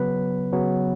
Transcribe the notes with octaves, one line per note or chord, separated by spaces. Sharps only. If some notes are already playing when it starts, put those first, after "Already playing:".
Already playing: C#3 F#3 B3 B4
C#3 F#3 B3